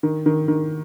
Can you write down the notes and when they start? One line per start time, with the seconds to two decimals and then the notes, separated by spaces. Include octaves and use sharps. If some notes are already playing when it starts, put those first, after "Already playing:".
0.03 D#3
0.26 D#3
0.48 D#3